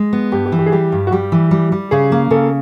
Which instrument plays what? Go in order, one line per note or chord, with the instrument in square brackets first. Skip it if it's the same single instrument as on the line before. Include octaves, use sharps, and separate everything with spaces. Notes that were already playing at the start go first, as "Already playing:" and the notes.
Already playing: [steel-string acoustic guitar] G#3
B3
[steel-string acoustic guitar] G2 [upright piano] G4
[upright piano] G4
[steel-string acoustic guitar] E3
[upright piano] G4
G#4
[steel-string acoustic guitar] G3 [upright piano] G4
[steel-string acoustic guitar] G2
[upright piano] F#4
[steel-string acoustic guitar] G3 [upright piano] G4
[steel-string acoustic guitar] E3
G3
G3
[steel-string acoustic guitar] C#3 [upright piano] G#4
[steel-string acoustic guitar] A#3
[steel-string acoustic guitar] C#3 [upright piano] A4